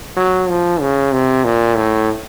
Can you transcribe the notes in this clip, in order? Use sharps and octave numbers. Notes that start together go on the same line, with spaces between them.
F#3
F3
C#3
C3
A#2
A2